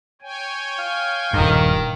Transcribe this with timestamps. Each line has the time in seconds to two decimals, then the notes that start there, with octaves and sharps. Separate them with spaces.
0.22 C#5 G5 G#5
0.79 F5
1.33 D#1 G2 D#3